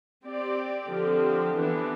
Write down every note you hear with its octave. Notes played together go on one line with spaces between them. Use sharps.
C4 G4 D5
D3 F3 C4 G4
E3 B3 D4